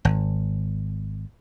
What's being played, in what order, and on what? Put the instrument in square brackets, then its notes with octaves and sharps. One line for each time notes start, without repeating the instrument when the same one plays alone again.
[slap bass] G#1